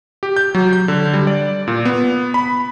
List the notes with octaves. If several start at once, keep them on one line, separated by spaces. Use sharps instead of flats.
G4
G6
F#3
G6
D3
G3
D5
A#2
B3
B5